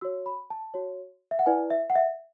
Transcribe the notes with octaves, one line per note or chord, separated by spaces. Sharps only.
F#4 C#5 E6
B5
A5
F#4 C#5
E5
F#5
E4 B4 D5 G#5
E5
F#5
E5